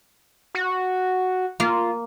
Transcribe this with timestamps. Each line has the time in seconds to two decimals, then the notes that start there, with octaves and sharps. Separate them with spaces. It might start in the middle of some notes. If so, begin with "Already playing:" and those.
0.55 F#4
1.60 A#3 F4